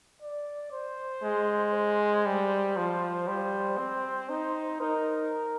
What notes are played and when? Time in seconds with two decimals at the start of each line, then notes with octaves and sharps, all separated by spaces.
0.22 D5
0.72 C5
1.24 G#3
1.74 C5
2.26 G3
2.77 F3 C5
3.28 G3 C5
3.78 C4
4.29 D#4
4.80 D#4 A#4